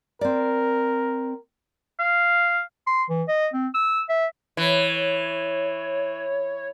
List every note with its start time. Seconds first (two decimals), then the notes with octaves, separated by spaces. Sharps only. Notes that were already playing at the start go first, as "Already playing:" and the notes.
0.21 C4 A#4 D5
1.99 F5
2.87 C6
3.09 E3
3.28 D#5
3.54 C4
3.74 E6
4.09 E5
4.57 E3 C#5